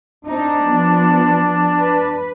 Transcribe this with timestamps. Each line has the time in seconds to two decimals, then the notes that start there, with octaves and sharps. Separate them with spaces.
0.25 C4 D4 D#4
0.62 F3 B3
1.77 B4